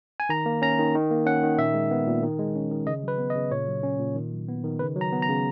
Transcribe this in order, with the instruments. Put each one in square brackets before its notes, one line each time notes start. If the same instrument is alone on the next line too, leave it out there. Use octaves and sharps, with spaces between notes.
[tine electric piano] G#5
D#3 A#5
A#3
C#4 A#5
D#3
D#3
A#3
C#4 F#5
D#3
A#2 E5
G#3
B3
A#2
D#3
G#3
C#4
D#3
C#3 D#5
F#3 B4
B3
D#5
C#3
A#2 C#5
F#3
C#4
A#2
D#3
F#3
B3
D#3
C#3 B4
F#3
A#5
B3
A#5
C#3